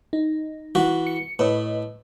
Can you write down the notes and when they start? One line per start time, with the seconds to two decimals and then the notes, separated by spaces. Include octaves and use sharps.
0.13 D#4
0.75 E3 F#4
1.07 C#7
1.39 A2 B4 C#5 D#5